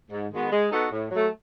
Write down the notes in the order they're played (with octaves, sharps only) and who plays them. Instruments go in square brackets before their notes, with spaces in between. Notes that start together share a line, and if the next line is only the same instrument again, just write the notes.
[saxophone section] G#2
D#3 G#3 B3 F#4
G#3
B3 D#4 F#4 A4
A2
F#3 A3